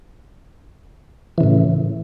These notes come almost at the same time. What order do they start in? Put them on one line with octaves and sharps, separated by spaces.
E3 C#3 A2